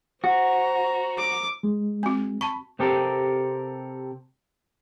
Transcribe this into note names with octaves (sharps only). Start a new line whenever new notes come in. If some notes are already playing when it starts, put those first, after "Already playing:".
F#4 C5 A#5
D6
G#3
C4 F#4
A5 B5 C#6
C3 C4 G4 A4 A#4